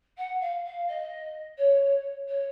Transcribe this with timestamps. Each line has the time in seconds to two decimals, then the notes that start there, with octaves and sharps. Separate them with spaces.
0.17 F#5
0.40 F5
0.64 F5
0.88 D#5
1.57 C#5
2.28 C#5